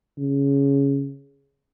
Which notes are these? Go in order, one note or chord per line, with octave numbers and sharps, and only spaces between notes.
C#3